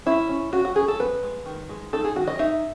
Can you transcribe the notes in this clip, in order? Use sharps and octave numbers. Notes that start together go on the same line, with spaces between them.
C#4 E4
C#4
C#4 F#4
F#4
C#4 G#4
A4
B3 B4
G#3
D#3
G#3
D#4 A4
G#4
D#3 F#4
D#5
D#4 E5